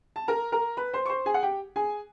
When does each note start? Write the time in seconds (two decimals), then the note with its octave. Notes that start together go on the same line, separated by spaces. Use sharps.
0.16 A5
0.28 A#4 A#5
0.52 A#4 A#5
0.77 B4 B5
0.93 C5 C6
1.06 C#6
1.09 C5 C6
1.26 G#4 G#5
1.34 F#5
1.43 G4 G5
1.76 G#4 G#5